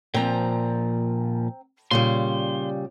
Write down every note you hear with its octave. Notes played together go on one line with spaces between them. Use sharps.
A#2 F3 C4 A#5
A#2 C#3 G3 C6